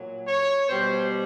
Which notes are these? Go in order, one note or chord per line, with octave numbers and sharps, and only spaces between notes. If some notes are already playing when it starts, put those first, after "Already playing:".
Already playing: A#2 F#3
C#5
B2 G3 C5